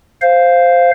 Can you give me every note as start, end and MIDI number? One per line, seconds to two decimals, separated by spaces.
0.22 0.91 72
0.22 0.91 77